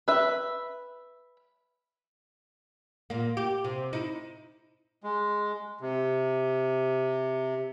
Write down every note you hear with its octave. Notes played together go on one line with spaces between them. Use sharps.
B4 E5
A#2 A#3
G4
C3
D#4 E4
G#3
C3